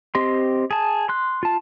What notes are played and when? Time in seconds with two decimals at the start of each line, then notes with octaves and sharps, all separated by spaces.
0.15 C4 G4 D#5 C6
0.71 G#4 A5
1.09 C6 F#6
1.43 F4 A5